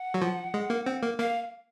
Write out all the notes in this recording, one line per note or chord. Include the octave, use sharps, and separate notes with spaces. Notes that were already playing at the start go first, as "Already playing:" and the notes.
Already playing: F#5
F#3
F3
G#3
A#3
C4
A#3
A#3 F5